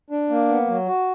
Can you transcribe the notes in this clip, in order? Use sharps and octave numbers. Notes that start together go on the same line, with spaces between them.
D4
A#3
B3
F#3
F#4